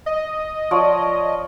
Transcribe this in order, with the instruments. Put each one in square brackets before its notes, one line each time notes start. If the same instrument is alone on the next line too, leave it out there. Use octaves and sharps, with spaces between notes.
[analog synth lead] D#5
[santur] F3 C#5 D5